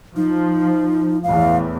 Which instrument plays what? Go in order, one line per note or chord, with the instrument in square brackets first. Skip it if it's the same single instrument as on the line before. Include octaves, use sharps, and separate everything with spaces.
[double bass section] F3 [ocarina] D#4
[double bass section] E2 A2 [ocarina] F5